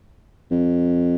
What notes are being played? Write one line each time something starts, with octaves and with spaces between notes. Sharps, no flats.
F2